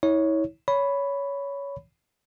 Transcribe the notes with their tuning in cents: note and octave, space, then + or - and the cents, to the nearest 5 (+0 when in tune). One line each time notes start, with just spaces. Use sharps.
E4 -35 C#5 +0
C#5 +15 B5 +0